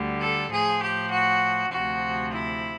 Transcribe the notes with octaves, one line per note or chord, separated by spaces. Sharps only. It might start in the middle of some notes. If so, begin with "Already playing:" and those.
Already playing: D2 D3 G3
A4
A2 F3 G#4
G4
F#4
D2 C3 F3 F#4
E4